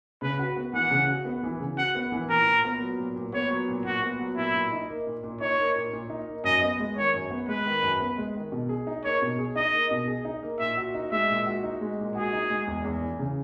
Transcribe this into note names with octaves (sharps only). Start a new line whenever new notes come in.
C#3 B4
F#4
B3
E3 F#5
C#3
F#4
B3
E3
C#3
F#4 F#5
B3
E3
A#2 A#4
A#2
B3
F#3
A#2
A#2
B3 C#5
F#3
A#2
A#2 F#4
B3
F#3
A#2 E4
A#2
D#4
A#3
A#2
A#2
D#4 C#5
A#3
A#2
A#2
D#4
A#3
F#2 D#5
B3
G#3
D#3 C#5
F#2
B3
G#3 B4
D#3
F#2
B3
G#3
D#3
B2
G#4
D#4
A#3 C#5
B2
G#4
D#4 D#5
A#3
B2
G#4
D#4
A#3
A#2 E5
F#4
D#4
G#3 E5
A#2
F#4
D#4
G#3
A#2
F#4 G#4
D#4
G#3
E2
E2
E3
C#3